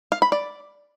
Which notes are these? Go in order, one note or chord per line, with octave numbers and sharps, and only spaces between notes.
F5
B5
D5